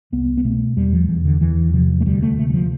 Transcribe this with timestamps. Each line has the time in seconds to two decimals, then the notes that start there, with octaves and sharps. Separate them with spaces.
0.12 C2 B3
0.37 B3
0.44 B2 A3
0.76 E2 G3
0.93 F3
1.09 E2 E3
1.25 D3
1.41 E2 E3
1.74 C3 F3
2.00 A3
2.06 D2 G3
2.22 A3
2.38 C3 A3
2.50 G3
2.54 F3